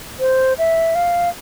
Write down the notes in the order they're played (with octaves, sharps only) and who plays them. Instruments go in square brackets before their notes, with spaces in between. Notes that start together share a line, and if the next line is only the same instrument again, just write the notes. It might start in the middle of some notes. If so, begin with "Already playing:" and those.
[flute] C5
E5
F5